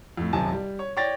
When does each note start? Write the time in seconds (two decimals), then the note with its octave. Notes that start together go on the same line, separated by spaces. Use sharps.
0.17 F2 A2
0.33 D#1 B1 F#2 C3 G#5 A5
0.52 G3
0.79 C#5
0.97 C#5 D5 G5 A6 A#6